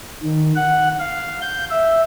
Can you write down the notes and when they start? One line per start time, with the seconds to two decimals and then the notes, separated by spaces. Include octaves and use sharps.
0.23 D#3
0.56 F#5
1.00 F5
1.42 G6
1.70 E5